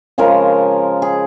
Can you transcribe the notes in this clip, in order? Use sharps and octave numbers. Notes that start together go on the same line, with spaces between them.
C#3 F3 G#3 A#4
G#4